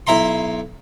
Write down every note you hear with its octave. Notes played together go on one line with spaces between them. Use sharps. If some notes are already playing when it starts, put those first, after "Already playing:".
B1 E4 E5 A#5 C6